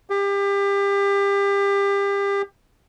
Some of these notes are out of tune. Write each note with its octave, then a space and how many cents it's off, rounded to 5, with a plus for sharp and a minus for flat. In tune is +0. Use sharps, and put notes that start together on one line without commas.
G4 +30